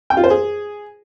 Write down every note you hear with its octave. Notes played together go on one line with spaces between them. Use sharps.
G5
F4
C5
G#4